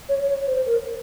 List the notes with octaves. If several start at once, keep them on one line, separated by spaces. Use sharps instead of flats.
C#5
C#5
C5
A#4